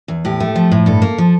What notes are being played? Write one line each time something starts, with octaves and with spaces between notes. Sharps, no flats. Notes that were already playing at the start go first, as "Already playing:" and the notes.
E2
A2 G4
A3
F3
A2
G2 A4
A#3
F3